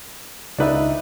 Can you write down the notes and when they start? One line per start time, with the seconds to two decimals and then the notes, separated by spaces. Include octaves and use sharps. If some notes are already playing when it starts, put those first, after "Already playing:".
0.58 C#2 D4 D#4 B4 E5